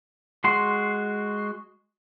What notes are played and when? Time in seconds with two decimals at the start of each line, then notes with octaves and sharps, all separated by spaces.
0.44 G#3 F#4 C6